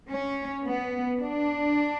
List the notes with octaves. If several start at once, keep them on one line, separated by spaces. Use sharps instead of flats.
C#4
B3
D4